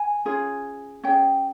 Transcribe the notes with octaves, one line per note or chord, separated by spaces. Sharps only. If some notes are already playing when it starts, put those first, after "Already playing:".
Already playing: G#5
C#4 F4 G#4
C#4 G#4 G5